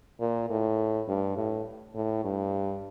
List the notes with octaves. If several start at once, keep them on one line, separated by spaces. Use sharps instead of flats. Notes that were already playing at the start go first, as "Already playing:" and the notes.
A#2
A2
G2
A2
A2
G2